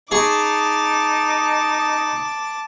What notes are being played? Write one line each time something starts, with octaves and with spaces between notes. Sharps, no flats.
D#4 G#4 G#5 A5 C#6 D6